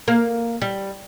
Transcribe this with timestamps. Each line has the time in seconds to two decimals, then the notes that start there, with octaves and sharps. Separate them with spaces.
0.08 A#3
0.62 G3